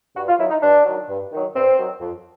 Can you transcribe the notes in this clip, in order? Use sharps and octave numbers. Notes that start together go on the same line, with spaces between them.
G2 F#4
F4
D#3 F#3 E4
D#4
G2 D4
D#3 F#3
G2
D#3 F#3
G2 C4
D#3 F#3
F2